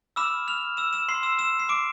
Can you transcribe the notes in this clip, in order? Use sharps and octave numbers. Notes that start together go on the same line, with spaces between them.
B5 D6 E6 F6 E7
F6 F7
E6 E7
E6 E7
C6 C7
E6 E7
E6 E7
C7
D6 D7